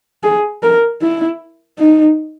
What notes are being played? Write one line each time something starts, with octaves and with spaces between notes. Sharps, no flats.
G#4
A#4
E4
D#4